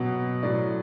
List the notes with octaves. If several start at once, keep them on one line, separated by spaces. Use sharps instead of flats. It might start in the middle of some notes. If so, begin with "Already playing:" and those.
Already playing: B2 F#3 F#5
A2 F#3 D5